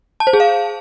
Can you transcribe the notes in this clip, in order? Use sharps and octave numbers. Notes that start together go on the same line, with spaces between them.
A5
C5
G#4
F5